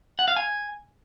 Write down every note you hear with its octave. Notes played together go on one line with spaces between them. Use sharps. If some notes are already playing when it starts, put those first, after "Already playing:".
F#5
F5
G#5